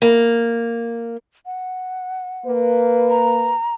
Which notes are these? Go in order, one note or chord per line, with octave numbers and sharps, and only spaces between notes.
A#3
F#5
A#3 B4
A#5